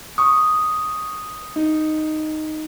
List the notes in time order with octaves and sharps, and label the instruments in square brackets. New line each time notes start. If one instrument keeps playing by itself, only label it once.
[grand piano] C#6 [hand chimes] D#6
[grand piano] D#4